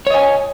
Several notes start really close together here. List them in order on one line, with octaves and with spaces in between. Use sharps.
C#5 D#5 G#5